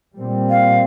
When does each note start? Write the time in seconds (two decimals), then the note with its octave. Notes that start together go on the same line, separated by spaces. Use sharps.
0.19 A#2 G3 C4
0.50 F5